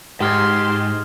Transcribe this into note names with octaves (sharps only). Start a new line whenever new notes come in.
G#2 G4 C6 D#6 F6 G#6